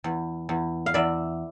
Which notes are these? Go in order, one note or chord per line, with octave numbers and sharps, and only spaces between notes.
E2
E2
F5
E2 D5 E5